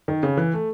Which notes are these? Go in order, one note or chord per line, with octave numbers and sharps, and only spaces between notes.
D#3
C#3
E3
A3